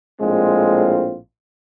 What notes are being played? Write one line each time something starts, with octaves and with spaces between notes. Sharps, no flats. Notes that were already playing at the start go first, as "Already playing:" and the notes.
A#1 A2 G#3 C4 F4